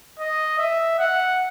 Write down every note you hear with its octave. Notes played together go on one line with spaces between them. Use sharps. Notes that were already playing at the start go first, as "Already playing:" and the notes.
D#5
E5
F#5